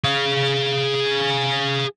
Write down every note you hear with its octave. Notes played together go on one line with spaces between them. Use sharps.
G#4 F5